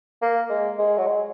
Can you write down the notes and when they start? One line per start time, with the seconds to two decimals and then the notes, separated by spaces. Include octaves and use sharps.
0.22 A#3
0.49 G#3
0.79 G#3
0.97 F#3
1.07 G#3